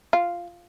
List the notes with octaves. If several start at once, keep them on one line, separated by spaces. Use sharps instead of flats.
F4